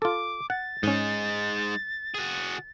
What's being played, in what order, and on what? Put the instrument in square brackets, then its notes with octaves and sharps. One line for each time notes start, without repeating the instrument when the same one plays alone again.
[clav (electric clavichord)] F4 A4 [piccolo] D6
[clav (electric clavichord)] F#5 [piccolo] A6
[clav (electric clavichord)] G#2 C#4 [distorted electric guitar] G#3 D#4
[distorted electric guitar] F#4 G#4